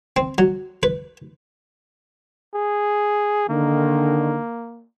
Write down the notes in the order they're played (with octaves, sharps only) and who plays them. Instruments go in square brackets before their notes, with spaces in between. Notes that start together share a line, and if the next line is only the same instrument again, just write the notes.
[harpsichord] C4
F#3
B4
[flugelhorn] G#4
[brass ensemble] D3 D#3 [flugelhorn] A#3